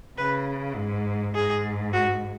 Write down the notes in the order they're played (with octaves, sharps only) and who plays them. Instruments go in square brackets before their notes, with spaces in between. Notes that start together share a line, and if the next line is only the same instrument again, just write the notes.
[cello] C#3 [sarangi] B4
[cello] G#2
[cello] G#2 [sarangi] G#4
[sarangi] F#4